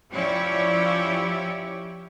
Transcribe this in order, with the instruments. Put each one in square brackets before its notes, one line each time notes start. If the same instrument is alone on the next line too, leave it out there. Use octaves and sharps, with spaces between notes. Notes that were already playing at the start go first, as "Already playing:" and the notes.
[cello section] F3 C#4 E4 G4 C#5 D5